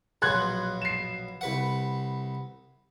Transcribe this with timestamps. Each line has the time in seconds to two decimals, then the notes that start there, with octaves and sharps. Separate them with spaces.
0.22 A#1 B2 F#3 C6 F#6 G#6
0.82 C7 E7
1.41 C2 B4 F#5